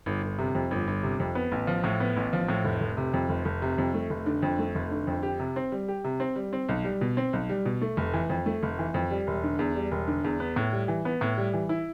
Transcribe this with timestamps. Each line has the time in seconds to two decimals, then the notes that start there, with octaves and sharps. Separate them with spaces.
0.06 G1
0.23 G1
0.38 C3
0.55 F2
0.71 G1
0.87 G1
1.03 C3
1.20 F2
1.35 B3
1.52 A1
1.67 F3
1.84 A2
2.00 B3
2.16 A1
2.33 F3
2.48 A2
2.65 F1
2.81 F1
2.97 C3
3.14 F2
3.29 F1
3.45 F1
3.62 C3
3.78 F2
3.94 A3
4.10 F1
4.26 D3
4.42 F2
4.59 A3
4.75 F1
4.91 D3
5.07 F2
5.23 G4
5.40 C3
5.56 C4
5.72 G3
5.88 G4
6.04 C3
6.20 C4
6.36 G3
6.53 C4
6.69 B1
6.85 G3
7.01 B2
7.17 C4
7.33 B1
7.49 G3
7.65 B2
7.82 A3
7.97 F1
8.14 E3
8.30 F2
8.46 A3
8.63 F1
8.79 E3
8.94 F2
9.11 G3
9.27 E1
9.44 D3
9.59 E2
9.76 G3
9.91 E1
10.08 D3
10.24 E2
10.40 B3
10.56 A2
10.73 G3
10.88 E3
11.05 B3
11.21 A2
11.37 G3
11.53 E3
11.69 E4